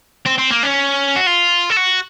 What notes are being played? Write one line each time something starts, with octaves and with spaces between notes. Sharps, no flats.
C4
C4
A#3
C#4
F#4
F4
A4
F#4